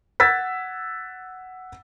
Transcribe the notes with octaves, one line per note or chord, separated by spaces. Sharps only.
F#5 E6 G#6 A6 B6